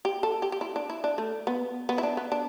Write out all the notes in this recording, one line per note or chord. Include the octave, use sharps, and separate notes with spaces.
G4
A4
G4
G4
E4
D4
E4
D4
A3
B3
B3
E4
D4
B3
D4